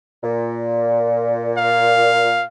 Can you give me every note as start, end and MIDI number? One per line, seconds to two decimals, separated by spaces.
0.23 2.39 46
1.58 2.45 77